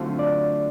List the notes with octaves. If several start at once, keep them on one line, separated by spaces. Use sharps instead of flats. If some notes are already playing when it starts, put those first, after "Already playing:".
Already playing: D3 F#3 A3 C4 F4
D5